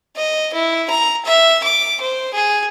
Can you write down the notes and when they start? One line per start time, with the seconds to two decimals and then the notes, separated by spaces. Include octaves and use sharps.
0.17 D#5
0.54 E4
0.90 A#5
1.25 E5
1.63 D6
2.01 C5
2.34 G#4